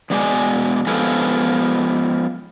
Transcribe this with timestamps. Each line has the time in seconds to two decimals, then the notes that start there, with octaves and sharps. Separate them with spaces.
0.10 E2 B2 G#3 D5 G#5
0.87 F3 G#3 B3 F4 G4 A4